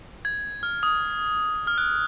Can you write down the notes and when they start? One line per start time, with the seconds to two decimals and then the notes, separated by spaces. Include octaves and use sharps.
0.25 G#6
0.63 F6
0.83 D#6
1.67 F6
1.78 F#6